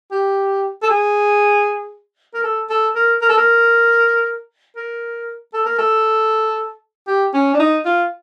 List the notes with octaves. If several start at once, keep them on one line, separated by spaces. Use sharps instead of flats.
G4
A4
G#4
A#4
A4
A4
A#4
A#4
A4
A#4
A#4
A4
A#4
A4
G4
C#4
D4
D#4
F4